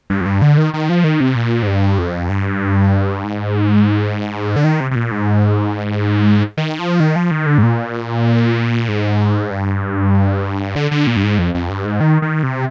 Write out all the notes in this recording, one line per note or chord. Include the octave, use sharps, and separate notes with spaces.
G2
F2
G2
D3
D#3
D#3
F3
D#3
C3
A#2
G#2
G2
F2
G2
G#2
D3
D#3
C3
C3
A#2
G#2
D#3
F3
D#3
F3
D#3
D3
G#2
A#2
G#2
G2
D3
D3
A#2
G2
G#2
F2
F2
G2
G#2
D#3
D#3
C3